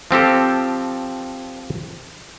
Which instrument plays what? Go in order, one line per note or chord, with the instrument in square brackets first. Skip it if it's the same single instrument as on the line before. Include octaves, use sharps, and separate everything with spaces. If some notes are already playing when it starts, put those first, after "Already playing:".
[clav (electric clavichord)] F3 C4 G4 A4